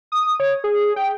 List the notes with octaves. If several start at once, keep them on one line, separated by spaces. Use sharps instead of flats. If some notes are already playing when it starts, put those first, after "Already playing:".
D#6
C#5
G#4
G5